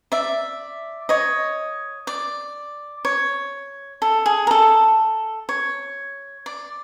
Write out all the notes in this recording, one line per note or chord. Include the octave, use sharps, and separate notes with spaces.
D5 E5
C#5 D#5
D5
C#5
A4
G#4
A#4
A4
C#5
D5